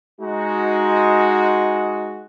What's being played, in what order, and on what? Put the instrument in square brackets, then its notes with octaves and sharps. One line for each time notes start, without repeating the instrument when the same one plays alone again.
[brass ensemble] G#3 D#4 F#4